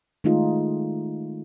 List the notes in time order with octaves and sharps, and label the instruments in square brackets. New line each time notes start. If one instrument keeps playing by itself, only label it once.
[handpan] D#3 G#3 A3 D#4 F4 G#4